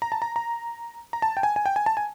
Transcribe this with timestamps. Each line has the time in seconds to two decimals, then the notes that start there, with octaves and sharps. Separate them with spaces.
0.02 A#5
0.12 A5
0.22 A#5
0.36 A#5
1.13 A#5
1.22 A5
1.37 G5
1.43 G#5
1.56 G#5
1.66 G5
1.76 G#5
1.86 A5
1.97 G#5